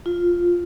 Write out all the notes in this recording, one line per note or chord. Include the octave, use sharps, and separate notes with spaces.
F4